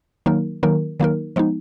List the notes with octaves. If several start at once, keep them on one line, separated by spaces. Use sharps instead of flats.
D#3 F#3 A#3 D#4 A#4
D#3 F#3 A#3 D#4 A#4
D#3 F#3 A#3 D#4 A#4
F3 G#3 B3 D#4